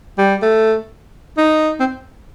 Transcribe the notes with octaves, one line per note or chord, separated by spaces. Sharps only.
G3
A3
D#4
C4